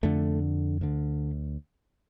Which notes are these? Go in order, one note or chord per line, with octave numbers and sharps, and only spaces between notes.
F2 D3 A3
D2 D3